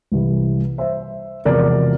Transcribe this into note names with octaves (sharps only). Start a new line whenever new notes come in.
C2 C3 E3 G3
C5 E5
E1 E2 C3 F3 A#4 D5